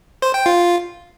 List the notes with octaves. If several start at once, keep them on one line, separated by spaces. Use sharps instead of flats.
C5
G5
F4